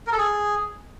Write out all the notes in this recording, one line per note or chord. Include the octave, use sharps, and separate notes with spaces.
A#4
A4
G#4